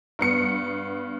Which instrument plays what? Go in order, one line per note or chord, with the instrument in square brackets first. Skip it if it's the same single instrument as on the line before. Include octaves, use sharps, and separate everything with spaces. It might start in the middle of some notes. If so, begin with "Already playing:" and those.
[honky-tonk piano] G2 B3 C#7